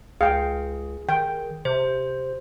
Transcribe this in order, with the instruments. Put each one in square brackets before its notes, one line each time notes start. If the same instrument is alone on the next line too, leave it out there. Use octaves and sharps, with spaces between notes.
[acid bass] C#2 [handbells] G#4 [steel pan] F5 G5
[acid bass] D#3 [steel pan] G5
[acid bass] C3 [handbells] C5